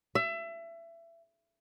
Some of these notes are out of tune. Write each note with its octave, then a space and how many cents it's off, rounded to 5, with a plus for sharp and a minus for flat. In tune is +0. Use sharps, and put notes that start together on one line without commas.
E5 +25